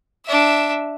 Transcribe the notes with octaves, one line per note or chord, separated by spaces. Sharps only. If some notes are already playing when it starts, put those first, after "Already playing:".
D4 E5